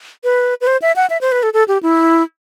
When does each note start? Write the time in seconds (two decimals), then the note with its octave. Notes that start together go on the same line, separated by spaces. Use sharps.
0.24 B4
0.61 B4
0.67 C5
0.82 E5
0.96 F#5
1.10 E5
1.21 C5
1.32 B4
1.43 A4
1.54 A4
1.68 G4
1.83 E4